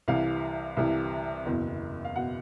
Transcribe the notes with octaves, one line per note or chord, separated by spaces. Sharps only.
C2 C3 E3 F5
C2 C3 E3
F#1 E2 B2
F5
B2 F#5